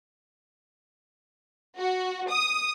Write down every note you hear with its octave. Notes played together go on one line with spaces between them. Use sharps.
F#4
D#6